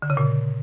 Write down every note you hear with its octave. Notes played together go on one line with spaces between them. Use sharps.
D3
C#3
A#2